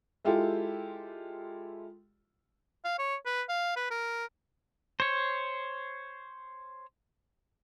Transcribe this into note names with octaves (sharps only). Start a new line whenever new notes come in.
G#3 E4 F4 G4 A4
F5
C#5
B4
F5
B4
A#4
C5 C#5